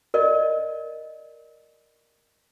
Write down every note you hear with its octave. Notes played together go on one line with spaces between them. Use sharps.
A#4 D5 D#5